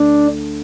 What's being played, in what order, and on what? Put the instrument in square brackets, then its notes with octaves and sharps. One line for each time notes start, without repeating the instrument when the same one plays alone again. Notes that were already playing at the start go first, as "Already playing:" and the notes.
Already playing: [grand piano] D2 D3 A3 [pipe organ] D4